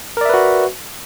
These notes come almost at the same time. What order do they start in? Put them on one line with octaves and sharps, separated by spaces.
A#4 D5 E5 B4 F#4